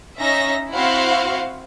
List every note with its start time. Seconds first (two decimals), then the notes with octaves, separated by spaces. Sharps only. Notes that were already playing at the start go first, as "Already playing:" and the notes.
0.19 C#4 D#4 E5 A#6
0.72 C4 E4 F#4 C5 F5 F#5